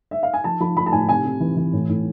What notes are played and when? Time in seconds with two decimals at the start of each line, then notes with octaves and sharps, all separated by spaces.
0.11 E5
0.23 F5
0.33 G#5
0.44 F3 A5
0.60 F3 B5
0.77 F3 B5
0.86 A5
0.92 A2 G#5
1.08 C3 G#5
1.25 C3
1.40 E3
1.57 E3
1.73 A2
1.89 A2